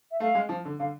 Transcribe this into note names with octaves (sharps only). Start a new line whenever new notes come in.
E5
A3 F5
G#3
F3
D3
D3 F5